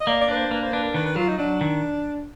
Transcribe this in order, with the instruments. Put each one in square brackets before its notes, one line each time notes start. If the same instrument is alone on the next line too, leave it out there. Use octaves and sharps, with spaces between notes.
[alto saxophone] D#5
[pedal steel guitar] A#3 [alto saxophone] D5
[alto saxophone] D5
[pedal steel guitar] D4 [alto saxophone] B4
[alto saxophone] C5
[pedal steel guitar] A#3 [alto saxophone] B4
[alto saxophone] C5
[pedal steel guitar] D4 [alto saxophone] B4
[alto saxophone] A#4
[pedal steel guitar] D#3 [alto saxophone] B4
[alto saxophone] B4
[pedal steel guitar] F#3 [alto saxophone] F4
[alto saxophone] D#4
[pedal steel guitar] F#3 [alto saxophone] D4
[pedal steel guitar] D#3